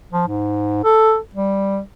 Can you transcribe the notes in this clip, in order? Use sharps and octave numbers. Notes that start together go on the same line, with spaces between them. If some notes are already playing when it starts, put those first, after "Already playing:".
F3
G#2
A4
G3